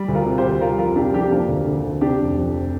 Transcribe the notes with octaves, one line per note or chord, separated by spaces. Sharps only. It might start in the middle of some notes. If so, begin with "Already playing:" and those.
Already playing: G3
D2
F4 A#4
C3
G4 C5
D2
G3 F4 A#4
F2 F4 A#4
C3 D4 G4
F2 D4 G4
F3 A#3 D4
D2
D3
D2
C3 D4 G4
F1
F2